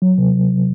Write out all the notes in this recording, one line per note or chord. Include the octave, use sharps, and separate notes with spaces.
F#3
C3